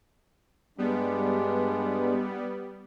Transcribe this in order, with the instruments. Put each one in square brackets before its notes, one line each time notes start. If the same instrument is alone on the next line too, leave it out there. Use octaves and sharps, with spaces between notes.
[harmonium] G2 G#3 D4 [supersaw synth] G3 B3